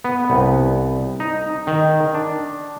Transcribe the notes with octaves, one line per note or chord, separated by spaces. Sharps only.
B3
C2
D#4
D#3
D4